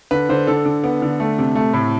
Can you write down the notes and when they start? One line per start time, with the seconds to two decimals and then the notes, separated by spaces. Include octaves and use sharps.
0.11 D3 B4
0.29 D3 C5
0.47 D3 A4
0.65 D3
0.84 B3
1.02 D3
1.20 A3
1.38 C3
1.55 A3
1.74 A2